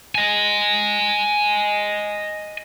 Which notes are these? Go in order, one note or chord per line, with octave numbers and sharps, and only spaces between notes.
D#5 G#5